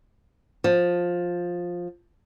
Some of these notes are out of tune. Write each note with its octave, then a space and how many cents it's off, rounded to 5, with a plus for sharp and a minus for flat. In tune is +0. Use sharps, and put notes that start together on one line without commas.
F3 +10